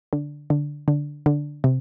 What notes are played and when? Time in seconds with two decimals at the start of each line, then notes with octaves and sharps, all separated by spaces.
0.13 D3
0.50 D3
0.88 D3
1.26 D3
1.64 C3